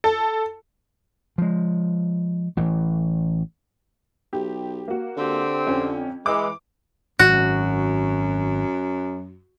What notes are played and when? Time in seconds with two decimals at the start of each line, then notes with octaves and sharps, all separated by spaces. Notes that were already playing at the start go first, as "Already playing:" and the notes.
0.04 A4
1.38 F3 G#3
2.57 A1 E3
4.33 B1 G4
4.88 A#3 F#4
5.17 D3 C4 G4
5.67 F2 C#4 G5
6.26 E3 G#3 D6
7.19 G#1 F#2 F#4